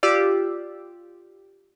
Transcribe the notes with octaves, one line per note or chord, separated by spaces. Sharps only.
F4 G4 D5 D6 E6